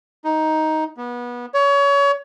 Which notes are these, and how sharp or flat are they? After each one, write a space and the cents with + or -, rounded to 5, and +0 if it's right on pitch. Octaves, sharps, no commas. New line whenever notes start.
D#4 +10
B3 -25
C#5 +25